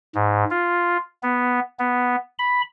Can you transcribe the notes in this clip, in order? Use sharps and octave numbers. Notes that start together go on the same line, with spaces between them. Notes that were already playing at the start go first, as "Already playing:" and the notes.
G#2
F4
B3
B3
B5